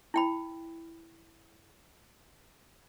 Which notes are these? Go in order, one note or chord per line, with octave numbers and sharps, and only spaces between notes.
E4 G5 B5